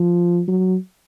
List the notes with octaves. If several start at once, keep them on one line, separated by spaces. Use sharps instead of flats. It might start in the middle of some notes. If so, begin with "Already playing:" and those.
Already playing: F3
F#3